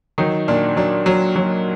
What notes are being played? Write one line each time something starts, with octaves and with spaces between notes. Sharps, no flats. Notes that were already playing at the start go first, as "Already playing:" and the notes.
D#3 F#3 D#4
A#2 D4
F#3 D4
F#3
F#3